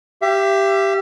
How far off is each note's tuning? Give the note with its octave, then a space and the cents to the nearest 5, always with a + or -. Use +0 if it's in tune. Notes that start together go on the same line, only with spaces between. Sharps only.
G4 +0 E5 +40